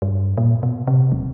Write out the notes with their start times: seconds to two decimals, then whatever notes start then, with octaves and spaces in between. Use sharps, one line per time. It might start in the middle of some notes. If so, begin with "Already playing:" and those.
0.02 G2
0.37 A#2
0.63 B2
0.87 C3
1.12 D#1